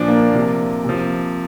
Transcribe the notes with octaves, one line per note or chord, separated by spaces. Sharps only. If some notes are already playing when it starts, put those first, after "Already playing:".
Already playing: A#2 F3 D4
A#3
C3 F3
C3 F3